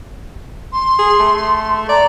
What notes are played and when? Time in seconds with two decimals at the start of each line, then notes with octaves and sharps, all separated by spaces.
0.73 C6
0.99 G#4
1.20 A3
1.89 D5 A#5